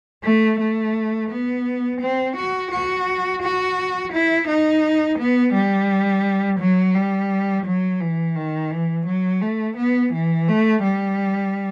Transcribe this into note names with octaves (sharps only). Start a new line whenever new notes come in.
A3
A3
B3
C4
F#4
F#4
F#4
E4
D#4
B3
G3
F#3
G3
F#3
E3
D#3
E3
F#3
A3
B3
E3
A3
G3